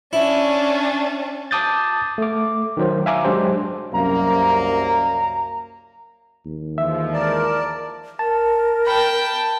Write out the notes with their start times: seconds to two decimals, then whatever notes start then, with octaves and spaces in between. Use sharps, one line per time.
0.13 C#4 D4 E4
1.51 A5 D6 D#6 G6 A6
2.18 A3 D6
2.77 D#3 F#3 C5
3.06 E5 F5 G#5 A#5 D6
3.24 F#3 G#3 D4 G4 C5
3.94 C2 F#2 A#3 A#5
6.46 D#2
6.78 E3 F3 G#3 E5
7.13 A#4 D5 A5
8.19 A#4 A5 A6
8.87 G5 A5 B5